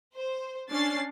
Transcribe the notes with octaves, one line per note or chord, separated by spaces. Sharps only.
C5
C#4 D4 A6 C7